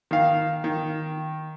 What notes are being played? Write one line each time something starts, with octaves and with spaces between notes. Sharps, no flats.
D#3 F5
D#3